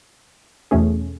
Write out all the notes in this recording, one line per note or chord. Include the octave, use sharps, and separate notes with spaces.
E2 B2 A3 C#4 G#4